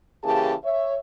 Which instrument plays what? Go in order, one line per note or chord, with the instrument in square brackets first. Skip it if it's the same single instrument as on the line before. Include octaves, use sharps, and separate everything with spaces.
[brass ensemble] C#3 E3 A#3 G4 G#4 A5
C#5 E5